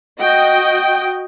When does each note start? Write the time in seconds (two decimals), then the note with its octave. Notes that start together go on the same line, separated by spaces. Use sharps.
0.20 F#4 D#5 G5